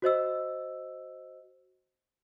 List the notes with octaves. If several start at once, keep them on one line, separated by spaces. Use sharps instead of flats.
F#4 C5 D#5 E6